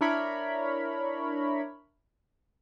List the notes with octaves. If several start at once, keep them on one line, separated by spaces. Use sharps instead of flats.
D4 E4 A#4 C#5 B5